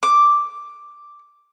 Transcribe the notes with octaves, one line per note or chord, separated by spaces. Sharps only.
D6